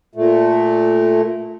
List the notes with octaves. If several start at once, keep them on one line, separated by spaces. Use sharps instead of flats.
A#2 A3